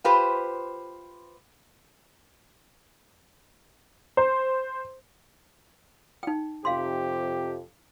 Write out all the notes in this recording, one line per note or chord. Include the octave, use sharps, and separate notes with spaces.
F4 G4 B4 C5
C5
D#4 G5
F2 C3 F3 G4 F5 C6